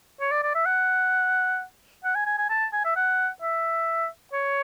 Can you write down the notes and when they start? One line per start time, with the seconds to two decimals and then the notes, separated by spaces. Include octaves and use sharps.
0.21 C#5
0.31 D5
0.43 D5
0.55 E5
0.66 F#5
2.05 F#5
2.15 G#5
2.26 G#5
2.38 G#5
2.50 A5
2.73 G#5
2.85 E5
2.96 F#5
3.42 E5
4.33 C#5